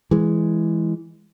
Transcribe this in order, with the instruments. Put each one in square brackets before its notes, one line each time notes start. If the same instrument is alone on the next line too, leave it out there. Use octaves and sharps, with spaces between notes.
[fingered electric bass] E3 G#3